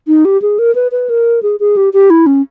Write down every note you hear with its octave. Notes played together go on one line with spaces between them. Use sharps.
D#4
G4
G#4
A#4
B4
B4
A#4
G#4
G#4
G4
G4
E4
C#4